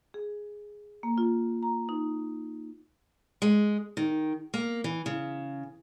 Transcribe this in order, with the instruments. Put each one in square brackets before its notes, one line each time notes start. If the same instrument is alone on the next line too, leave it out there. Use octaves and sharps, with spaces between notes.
[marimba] G#4
A#3
F4
A#5
D#4
[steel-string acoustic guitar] G#3
D#3
A#3
E3
C#3